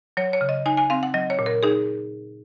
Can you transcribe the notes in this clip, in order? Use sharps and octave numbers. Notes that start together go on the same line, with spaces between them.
F#3 C#5
C#5
C#3
D#5
D#4 G#5
G#5
C4 F5
F#5
F#3 D#5
C#5
A#2
A#4
D#4 G#4